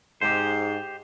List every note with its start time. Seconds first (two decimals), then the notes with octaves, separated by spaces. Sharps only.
0.21 G#2 G4 C5